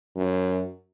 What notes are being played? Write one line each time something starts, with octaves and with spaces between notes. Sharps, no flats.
F#2